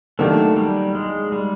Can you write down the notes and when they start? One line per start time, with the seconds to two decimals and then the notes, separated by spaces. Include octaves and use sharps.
0.19 D#3 F#3 A3 A#3 D4 G4
0.57 G3
0.95 G#3
1.32 G3